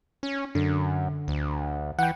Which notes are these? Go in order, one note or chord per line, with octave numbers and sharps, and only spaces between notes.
C#4
F#2 D3
D2
E3 F#5 G5